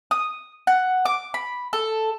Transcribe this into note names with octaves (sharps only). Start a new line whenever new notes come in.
D#6
F#5
D6
B5
A4